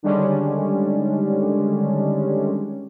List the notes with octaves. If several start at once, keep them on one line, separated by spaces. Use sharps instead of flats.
D3 D#3 G3 G#3 C#4 D4